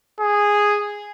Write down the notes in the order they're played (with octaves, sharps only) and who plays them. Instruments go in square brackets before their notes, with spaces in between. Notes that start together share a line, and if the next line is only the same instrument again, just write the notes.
[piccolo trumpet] G#4